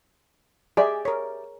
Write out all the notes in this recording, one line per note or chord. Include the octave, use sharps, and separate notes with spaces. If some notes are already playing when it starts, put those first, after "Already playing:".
G4 G#4 D5 E5
A#4 C#5